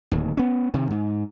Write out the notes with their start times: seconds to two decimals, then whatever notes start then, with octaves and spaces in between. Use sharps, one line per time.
0.11 D1 D#2
0.37 B3 C#4
0.74 C3 D#3
0.90 G#2